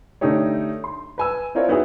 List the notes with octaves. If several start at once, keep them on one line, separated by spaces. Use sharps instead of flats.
D3 A3 D4 D#4 G4 C#5
C6
B4 G#5 E6
C4 E4 F4 A#4 C#5 D5
B3 D#4 E4 F#4 G#4